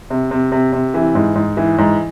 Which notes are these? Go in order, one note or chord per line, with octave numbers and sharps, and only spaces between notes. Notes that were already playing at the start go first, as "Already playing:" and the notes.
C3
C3
C3
C3
E3
G#2
G#2
E3
G#2